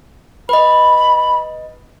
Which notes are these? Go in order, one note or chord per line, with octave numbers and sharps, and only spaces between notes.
B4 D#5 B5